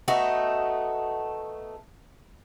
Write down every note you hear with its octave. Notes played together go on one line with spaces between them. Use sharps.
A3 B3 D#4 F#4